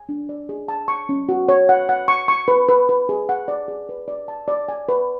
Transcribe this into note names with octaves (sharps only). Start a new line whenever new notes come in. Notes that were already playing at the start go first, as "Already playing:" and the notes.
Already playing: G#5
D4
D5
G#4
A5
C#6
C#4
F#4
C#5
F#5
F#5
C#6
C#6
B4
B4
B4
G#4
F#5
D5
G#4
B4
D5
A5
D5
G#5
B4